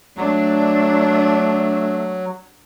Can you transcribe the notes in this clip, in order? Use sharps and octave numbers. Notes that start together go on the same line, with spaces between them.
F#3 A3 D4